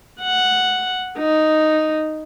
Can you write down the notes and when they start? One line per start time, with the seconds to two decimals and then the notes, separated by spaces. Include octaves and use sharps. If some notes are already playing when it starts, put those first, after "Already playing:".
0.21 F#5
1.18 D#4